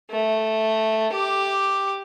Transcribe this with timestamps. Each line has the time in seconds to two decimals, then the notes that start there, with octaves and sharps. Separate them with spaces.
0.11 A3
1.12 G4 D6